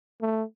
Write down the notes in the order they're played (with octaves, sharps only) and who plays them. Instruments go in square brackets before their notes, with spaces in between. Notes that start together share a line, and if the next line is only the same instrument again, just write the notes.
[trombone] A3